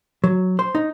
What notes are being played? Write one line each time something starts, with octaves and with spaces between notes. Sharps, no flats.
F#3
C5
D#4